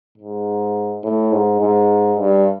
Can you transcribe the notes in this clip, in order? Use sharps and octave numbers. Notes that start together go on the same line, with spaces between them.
G#2
A2
G#2
G#2
G2